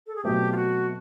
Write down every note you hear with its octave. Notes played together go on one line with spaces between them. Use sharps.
A4
G#4
B2 F#3 A3 C4 G4
F4
F#4